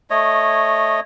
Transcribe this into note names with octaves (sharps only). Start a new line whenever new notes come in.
A3 C#5 D#5